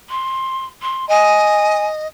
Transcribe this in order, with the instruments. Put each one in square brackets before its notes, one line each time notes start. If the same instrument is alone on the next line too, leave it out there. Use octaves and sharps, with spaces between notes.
[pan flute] C6
C6
[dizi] D#5 [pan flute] G#5